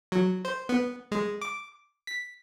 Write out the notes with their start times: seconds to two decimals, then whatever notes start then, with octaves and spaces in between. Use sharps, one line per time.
0.12 F#3
0.45 C5
0.69 B3
1.12 G#3
1.42 D6
2.07 B6